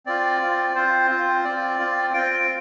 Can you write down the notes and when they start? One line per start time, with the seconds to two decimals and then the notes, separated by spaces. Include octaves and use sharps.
0.06 C4 F4 D5
0.41 C4 F4
0.75 C4 F4 C5
1.10 C4 F4
1.44 C4 F4 D5
1.79 C4 F4
2.14 C4 F4 G5
2.31 G5